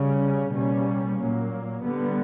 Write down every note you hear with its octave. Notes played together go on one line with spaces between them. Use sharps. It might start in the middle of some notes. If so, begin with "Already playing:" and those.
Already playing: C#3 G3 C#4
B2 G3 A#3 C#4
A#2 F#3 A#3
D3 G3 B3